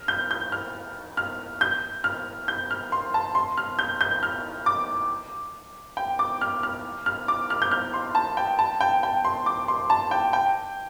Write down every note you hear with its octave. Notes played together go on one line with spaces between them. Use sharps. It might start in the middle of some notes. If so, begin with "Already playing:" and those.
Already playing: F6
G6
G6
F6
F6
G6
F6
G6
F6
C6
A5
C6
F6
G6
G6
F6
D6
G5
D6
F6
F6
F6
D6
F6
G6
F6
C6
A5
G5
A5
G5
G5
C6
D6
C6
A5
G5
G5